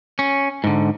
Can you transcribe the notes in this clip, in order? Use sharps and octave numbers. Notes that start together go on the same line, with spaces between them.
C#4
G#2 D3